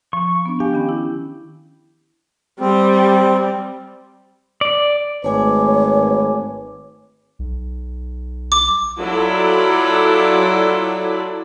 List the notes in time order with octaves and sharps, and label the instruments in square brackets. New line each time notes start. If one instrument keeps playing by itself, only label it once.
[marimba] F3 [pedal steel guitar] C#6
[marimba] B3 D4
[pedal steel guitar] G4 [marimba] F5 G#5
[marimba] D#3 C#4 B5
E4
[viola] G3 [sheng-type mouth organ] C4
[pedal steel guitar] D5
[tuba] G#1 [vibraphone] A3 G#5 D6 [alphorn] B4 [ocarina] C#5
[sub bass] B1
[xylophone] D6
[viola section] F#3 E4 F4 A4 D5